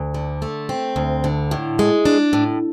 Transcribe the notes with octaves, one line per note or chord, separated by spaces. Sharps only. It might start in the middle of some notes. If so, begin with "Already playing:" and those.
Already playing: D2
D3
A3
C4
D2
D3
A2
G#3
D4
A2